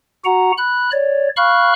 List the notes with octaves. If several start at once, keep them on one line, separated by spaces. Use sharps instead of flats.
F#4 F#5 A#5
B5 F#6
C#5 D5
F5 B5 C#6 F6 F#6